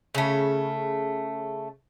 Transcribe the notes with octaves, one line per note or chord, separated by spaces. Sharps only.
C#3 A3